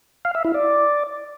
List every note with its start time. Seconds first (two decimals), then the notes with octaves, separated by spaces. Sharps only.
0.25 F5
0.35 E5
0.45 E4
0.54 D5